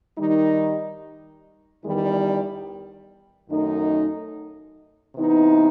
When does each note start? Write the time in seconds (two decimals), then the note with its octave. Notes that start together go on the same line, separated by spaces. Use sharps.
0.18 D#3 G3 D#4
1.83 E2 D#3 G3
3.50 F#2 D#3 A3 D#4
5.15 C3 E3 B3 D#4